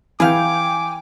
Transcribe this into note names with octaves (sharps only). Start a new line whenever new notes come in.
E3 G#4 B4 F5 G5 G#5 D6